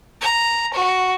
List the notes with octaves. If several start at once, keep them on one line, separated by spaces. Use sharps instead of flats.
A#5
F#4